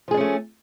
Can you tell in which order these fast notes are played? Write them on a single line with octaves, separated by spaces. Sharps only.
F3 G#4 D4 C#4 A3